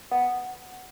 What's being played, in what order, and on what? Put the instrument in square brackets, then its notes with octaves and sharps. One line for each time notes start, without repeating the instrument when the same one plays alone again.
[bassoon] B3